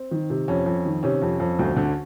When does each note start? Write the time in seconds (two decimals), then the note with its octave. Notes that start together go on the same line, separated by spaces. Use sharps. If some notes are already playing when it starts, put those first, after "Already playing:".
Already playing: C4
0.11 D#3
0.30 C3
0.48 F2 C#4
0.66 F2
0.85 D#3
1.03 C3 C#4
1.22 F2
1.40 F2
1.59 D2
1.77 D3